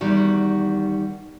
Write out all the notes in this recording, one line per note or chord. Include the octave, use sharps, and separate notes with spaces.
E2 D#3 G3 F#4